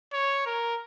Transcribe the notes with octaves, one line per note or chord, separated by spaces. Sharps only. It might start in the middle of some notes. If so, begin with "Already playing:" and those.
C#5
A#4